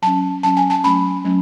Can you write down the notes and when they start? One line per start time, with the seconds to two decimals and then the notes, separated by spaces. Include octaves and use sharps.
0.02 F#3 C#4 A5
0.43 F#3 C#4 A5
0.57 G#5
0.70 A5
0.83 F#3 A3 C#4 B5
1.25 F#3 A3 C#4